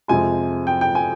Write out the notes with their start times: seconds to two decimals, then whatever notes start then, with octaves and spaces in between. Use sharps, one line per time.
0.08 F2 C3 F3 G#3 G#5
0.67 G5
0.81 G5
0.95 G#5